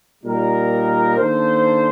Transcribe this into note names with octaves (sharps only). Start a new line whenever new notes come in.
A#2 G3 A#3 D#4 A#4
D#3 A#3 D4 A4 C5